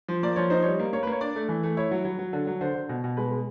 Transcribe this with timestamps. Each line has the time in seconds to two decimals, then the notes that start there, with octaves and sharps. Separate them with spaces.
0.08 F3
0.23 A#3 D5
0.36 F3 C#5
0.50 D#4 C5
0.63 G3 C#5
0.79 A#3
0.93 A#3 C#5
1.03 B4
1.07 A#3 C#5
1.21 D4 D5
1.36 A3
1.49 E3
1.63 A3
1.77 E4 C#5
1.91 F#3
2.05 F#3
2.19 F#3
2.33 D3
2.47 F#3
2.61 D3 C5
2.75 D3
2.89 B2
3.04 B2
3.17 G#3 B4
3.31 G#3